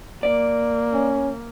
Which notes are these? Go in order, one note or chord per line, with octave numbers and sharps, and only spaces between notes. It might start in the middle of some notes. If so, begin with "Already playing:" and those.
A#3 D5
C#4